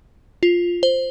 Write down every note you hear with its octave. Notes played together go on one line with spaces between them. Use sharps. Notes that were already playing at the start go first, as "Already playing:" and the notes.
F4
C5